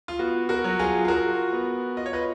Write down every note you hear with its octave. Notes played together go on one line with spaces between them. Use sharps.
F4
B3 F#4
F#4 A#4
F#3
F4 G#4
G#4
F4 F#4 A#4
B3
F4 D#5
C#5
B4 D#5